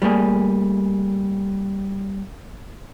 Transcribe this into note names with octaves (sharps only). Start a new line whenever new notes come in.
G3 A3 A#3 G#4